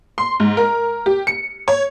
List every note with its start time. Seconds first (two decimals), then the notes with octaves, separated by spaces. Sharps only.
0.18 C6
0.40 G#2
0.57 A#4
1.06 G4
1.27 C#7
1.68 C#5